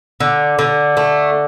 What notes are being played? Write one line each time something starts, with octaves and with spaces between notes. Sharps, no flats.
D3
D3
A3